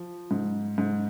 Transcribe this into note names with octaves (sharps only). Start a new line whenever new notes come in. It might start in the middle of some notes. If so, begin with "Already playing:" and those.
Already playing: F3
G#2
G#2